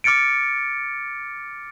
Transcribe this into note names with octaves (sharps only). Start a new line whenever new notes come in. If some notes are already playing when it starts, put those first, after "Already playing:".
D6 F6 A6 C#7 D7